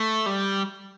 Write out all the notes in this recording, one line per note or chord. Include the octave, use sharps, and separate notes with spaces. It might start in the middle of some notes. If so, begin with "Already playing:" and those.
Already playing: A3
G3